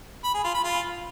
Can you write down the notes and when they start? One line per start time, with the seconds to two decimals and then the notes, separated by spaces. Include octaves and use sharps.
0.24 B5
0.34 G#4
0.44 F4
0.54 B5
0.64 F4